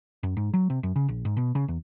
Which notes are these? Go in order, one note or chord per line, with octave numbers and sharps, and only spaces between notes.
F#2
G#2
F#3
C3
F#2
C#3
A#1
G#2
B2
C#3
E2